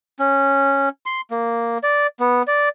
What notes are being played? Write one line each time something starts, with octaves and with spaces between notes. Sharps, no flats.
C#4
C6
A#3
D5
B3
D5